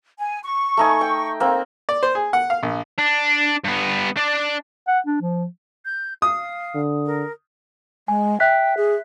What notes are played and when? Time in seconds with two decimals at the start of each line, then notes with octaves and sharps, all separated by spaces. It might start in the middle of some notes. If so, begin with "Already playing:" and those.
0.19 G#5
0.43 C#6
0.77 A3 D#4 G#5
1.01 G5
1.40 A#3 C4
1.89 D5
2.03 C5
2.15 G#4
2.33 F#5
2.50 F5
2.63 A#1
2.99 D4
3.65 G2 B3
4.17 D4 D5
4.88 F#5
5.07 D4
5.21 F3
5.85 G6
6.22 F5 D#6
6.75 D3
7.06 A#4
8.08 G#3 G#5
8.40 E5 G5 F#6 B6
8.77 G#4